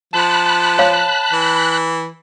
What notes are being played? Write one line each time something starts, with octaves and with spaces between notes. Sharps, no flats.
F3 A5 B5 F#6
C#5 F5
E3